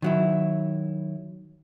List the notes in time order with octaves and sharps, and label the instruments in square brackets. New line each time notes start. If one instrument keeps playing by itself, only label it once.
[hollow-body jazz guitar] D#3 F#3 E4